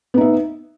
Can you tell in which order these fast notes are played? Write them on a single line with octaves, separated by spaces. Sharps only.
B3 D#4 E5